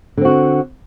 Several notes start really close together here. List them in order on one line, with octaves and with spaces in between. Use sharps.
D3 C4 F#4